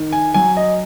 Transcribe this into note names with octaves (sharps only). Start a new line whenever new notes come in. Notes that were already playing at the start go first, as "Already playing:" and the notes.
Already playing: D#3 D#4
G#5
F#3 G#5
D#5